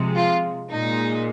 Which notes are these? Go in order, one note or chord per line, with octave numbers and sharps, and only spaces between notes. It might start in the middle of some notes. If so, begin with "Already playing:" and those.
Already playing: C3 F3 G#3
F4
A#2 G#3 D#4